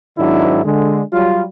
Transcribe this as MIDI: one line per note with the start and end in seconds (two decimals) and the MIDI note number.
0.18 0.60 44
0.18 0.60 51
0.18 0.60 54
0.18 0.60 60
0.18 0.60 62
0.18 0.60 64
0.65 1.02 50
0.65 1.02 56
1.12 1.44 54
1.12 1.44 55
1.12 1.44 65